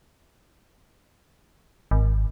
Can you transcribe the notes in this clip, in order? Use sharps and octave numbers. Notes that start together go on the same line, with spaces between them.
G#1